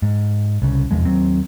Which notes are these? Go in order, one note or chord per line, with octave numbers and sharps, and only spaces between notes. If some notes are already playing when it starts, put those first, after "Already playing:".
G#2
C2 C#3
F1 E2 F3 G#3
D#2 F#3 C4